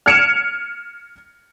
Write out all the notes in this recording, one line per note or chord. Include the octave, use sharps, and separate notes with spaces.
F6 G#6 C#7 D7 E7 F7